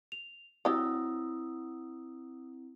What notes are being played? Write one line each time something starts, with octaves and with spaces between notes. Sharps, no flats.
F7
F#3 C4 E4 G4 D#6 E6